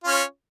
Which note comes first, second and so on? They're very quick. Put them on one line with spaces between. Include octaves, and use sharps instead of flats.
F4 C#4 C#5